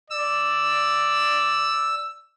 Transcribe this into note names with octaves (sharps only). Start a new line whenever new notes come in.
D5 E6